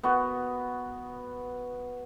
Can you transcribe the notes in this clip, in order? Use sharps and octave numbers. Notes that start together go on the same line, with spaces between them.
B3 F#4